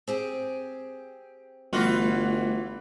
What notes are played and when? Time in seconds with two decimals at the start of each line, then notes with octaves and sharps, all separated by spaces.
0.08 C4 G4 G#4
1.73 G1 E3 G3 A3 F4 F#4